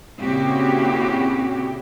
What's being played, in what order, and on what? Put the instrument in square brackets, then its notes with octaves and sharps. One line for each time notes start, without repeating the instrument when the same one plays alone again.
[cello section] A#2 C#3 C4 E4 F#4 G4